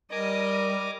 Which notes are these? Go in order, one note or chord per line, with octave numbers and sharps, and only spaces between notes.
G3 A#4 D#5 G#5 A#5 D6